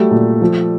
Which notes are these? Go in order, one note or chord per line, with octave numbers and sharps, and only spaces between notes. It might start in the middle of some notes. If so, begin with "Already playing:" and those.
Already playing: F#3 G3 A3
A#2
F3